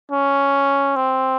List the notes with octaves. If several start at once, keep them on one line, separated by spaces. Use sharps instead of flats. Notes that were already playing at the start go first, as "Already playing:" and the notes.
C#4
C4